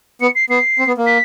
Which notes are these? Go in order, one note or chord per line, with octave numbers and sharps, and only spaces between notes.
B3 C#7
C7
B3 C7
C4
B3
A#3
B6